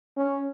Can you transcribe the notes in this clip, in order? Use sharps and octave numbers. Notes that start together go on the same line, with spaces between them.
C#4